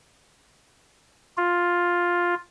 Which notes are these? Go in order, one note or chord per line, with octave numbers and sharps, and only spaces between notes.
F4